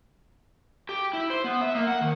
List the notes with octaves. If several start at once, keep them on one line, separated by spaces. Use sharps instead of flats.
G4
E4
C5
B3
E5
A#3
F#5
D#3